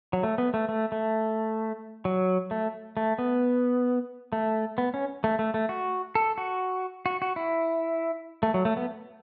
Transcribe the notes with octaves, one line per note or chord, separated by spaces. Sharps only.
F#3
A3
B3
A3
A3
A3
F#3
A3
A3
B3
A3
B3
C#4
A3
A3
A3
F#4
A4
F#4
F#4
F#4
E4
A3
F#3
A3
B3